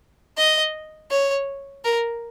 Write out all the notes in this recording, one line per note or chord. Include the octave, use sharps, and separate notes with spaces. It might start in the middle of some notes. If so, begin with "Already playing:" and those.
D#5
C#5
A#4